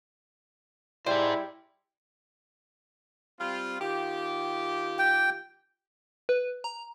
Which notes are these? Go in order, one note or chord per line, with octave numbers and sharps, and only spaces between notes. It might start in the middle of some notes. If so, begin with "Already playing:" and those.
G3 E4 G#4 C5 D5 G5
G3 C4 F4
D#3 F4 G4
G5
B4
A#5